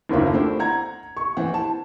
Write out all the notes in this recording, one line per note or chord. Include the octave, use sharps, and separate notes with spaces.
F#1 D#2 D3 C4 F4
A3 C4 D4 E4
F#5 A#5 G#6
C#6
E3 C4 F#5
A5